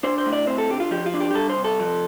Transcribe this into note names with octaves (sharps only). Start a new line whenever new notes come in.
D4 C5
C5
A2
D5
C4 C5
A4
D3 G4
F4
F3 G4
F4
D4
G4
G4
G3 A4
C5
C3
A4
F3